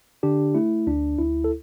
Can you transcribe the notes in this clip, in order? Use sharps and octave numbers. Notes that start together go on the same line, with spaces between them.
D3 D4 G4
A3 E4
D2 D4
D2 E4
A4